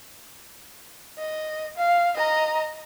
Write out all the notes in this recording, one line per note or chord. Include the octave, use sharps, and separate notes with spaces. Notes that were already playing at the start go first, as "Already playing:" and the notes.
D#5
F5
D#5 A#5